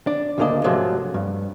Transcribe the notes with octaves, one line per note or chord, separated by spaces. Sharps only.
D4
D2 A#2 C#3 A#3 D4 D#5
G#2 C3 F3 F#3 G#3 A3
G2